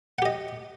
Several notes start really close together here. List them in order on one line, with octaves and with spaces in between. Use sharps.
F#5 G4 D#5